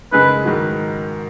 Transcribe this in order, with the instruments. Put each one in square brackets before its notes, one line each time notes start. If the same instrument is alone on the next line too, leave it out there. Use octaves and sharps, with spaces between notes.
[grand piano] F#2 C#3 G#3 D#4 [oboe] B4
[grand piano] G#2 D#3 F#3